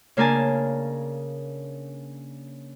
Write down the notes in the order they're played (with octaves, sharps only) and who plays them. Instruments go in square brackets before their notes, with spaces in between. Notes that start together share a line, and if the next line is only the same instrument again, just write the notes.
[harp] C#3 A#3 D4 A#4 G#5 A5